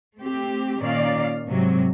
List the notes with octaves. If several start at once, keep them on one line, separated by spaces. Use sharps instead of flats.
A3 C4 G4
A#2 D#3 C#4 D5 F5
G#2 C3 F#3